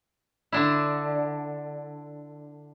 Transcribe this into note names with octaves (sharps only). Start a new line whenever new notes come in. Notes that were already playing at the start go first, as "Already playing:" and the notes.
D3 D4 E4